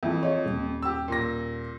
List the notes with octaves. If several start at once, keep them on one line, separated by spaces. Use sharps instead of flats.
F2 E3
F4 C#5 D#5
D#1
G4 E6
A#2 A#6